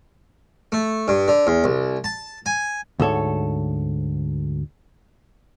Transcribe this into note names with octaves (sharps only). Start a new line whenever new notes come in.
A3
G2
D3
E2
C2
A5
G#5
D2 G#2 A4 C#5